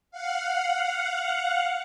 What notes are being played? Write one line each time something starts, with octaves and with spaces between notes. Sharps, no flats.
F5 F#5